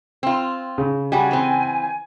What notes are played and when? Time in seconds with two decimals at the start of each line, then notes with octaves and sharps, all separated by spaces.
0.23 C4 F4
0.78 C#3
1.12 G3 F#4 G#5
1.31 E3 C4